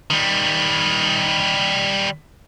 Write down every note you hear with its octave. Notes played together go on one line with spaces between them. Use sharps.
D#3 G3